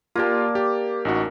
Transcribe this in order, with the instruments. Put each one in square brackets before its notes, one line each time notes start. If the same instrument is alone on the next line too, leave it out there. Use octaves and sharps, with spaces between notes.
[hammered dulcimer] A#3 D5 A5 [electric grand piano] F4 G4
[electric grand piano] G4
A1 D#4 F#4